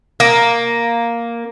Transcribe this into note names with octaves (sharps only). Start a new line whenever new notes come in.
A#3